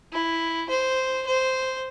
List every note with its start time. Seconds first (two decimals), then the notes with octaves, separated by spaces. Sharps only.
0.12 E4
0.69 C5
1.27 C5